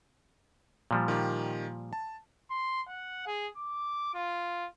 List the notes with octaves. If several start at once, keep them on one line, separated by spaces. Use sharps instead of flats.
A#2 F3 G3
D#3 G4
A5
C6
F#5
G#4
D6
F4